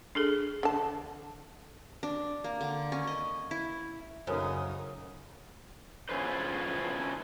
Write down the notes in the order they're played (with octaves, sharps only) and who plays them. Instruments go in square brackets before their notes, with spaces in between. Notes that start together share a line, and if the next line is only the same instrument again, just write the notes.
[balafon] D4 G#4 A4
[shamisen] D3 A5
[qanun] D4
A#3
D3
C#4
D#5
E4
[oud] F#2 [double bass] C#3 D#4 [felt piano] A4 A#4 [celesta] C5 C#5 D#6
[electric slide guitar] C#4 E4 F4 G#4 B4 C5